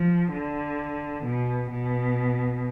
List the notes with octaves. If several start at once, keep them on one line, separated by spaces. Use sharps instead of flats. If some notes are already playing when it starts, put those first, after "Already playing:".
Already playing: F3
D3
B2
B2